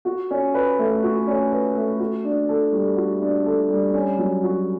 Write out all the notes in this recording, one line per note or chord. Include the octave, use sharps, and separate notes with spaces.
F#4
C#4
B4
A3
F#4
C#4
B4
A3
F#4
D4
A4
G3
F#4
D4
A4
G3
C#4
F#3
F#4